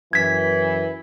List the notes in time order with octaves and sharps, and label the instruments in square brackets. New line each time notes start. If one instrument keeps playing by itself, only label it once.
[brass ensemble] F#2 E3 [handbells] G#6 B6